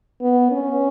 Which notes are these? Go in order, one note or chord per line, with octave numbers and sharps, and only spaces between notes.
B3
C#4